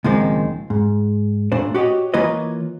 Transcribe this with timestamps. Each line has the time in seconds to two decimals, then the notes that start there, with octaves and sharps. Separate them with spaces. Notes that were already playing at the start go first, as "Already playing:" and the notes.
0.04 C#2 A#2 D#3 F3 G#3 C4
0.70 G#2
1.52 A#2 A3 D4 C5
1.75 F#4 G4 C#5 D#5
2.14 E3 A#3 F4 B4 C#5 D#5